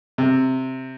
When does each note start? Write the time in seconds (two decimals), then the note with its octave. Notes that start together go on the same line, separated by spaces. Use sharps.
0.18 C3